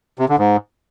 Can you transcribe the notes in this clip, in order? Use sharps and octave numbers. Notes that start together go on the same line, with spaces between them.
C3
D3
G#2